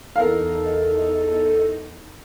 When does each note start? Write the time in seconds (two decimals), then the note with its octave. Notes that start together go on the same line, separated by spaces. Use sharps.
0.16 E2 D#4 A4 A#4 F5